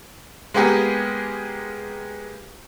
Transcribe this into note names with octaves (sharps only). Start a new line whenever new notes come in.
G#3 A#3 B3 G4 G#4 A#4